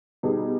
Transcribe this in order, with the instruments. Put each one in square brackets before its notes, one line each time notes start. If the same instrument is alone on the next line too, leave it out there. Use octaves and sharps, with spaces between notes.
[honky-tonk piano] B2 G3 B3 D#4 G#4